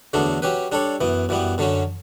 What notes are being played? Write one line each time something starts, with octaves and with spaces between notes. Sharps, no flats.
E2 D3 F#3 A3 D4
F#3 C#4 G4 B4
G3 D4 A4 C#5
F#2 E3 B3
F#2 E3 G3 B3
F#2 D3 F#3 C#4